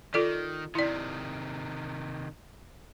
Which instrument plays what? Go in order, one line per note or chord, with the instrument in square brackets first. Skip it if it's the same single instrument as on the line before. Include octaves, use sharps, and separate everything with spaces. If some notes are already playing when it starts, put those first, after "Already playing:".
[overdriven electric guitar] D#3 [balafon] F4 A4 D5
[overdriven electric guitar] C3 D#3 [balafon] E4 D5